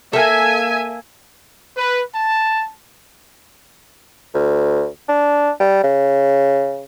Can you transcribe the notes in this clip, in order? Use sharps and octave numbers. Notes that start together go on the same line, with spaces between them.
A#3 A4 E5 G#5
B4
A5
D2
D4
G3
C#3